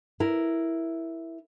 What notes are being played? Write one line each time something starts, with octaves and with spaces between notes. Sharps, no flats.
E4 A#4